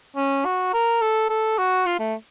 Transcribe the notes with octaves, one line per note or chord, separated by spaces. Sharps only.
C#4
F#4
A#4
A4
A4
F#4
F4
A3